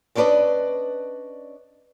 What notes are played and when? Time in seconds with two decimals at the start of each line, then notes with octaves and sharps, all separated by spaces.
0.15 B3 C#4 D4 B4 D5 D#5